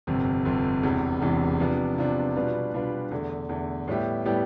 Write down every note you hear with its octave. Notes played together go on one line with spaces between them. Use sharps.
G1 F2 C3
G1 F2 C3
E1 E2 C3 E3
E1 E2 C3 E3
C3 F3 B3 D4
C3 F3 B3 D4
B2 G3 D4 F4 B4
B2 G3 D4 F4 B4
E2 D3 A3
E2 D3 A3
A2 G3 B3 E4 G4
A2 G3 B3 E4 G4